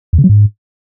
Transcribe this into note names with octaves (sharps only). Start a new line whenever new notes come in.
E2
C#3
F#3
G#2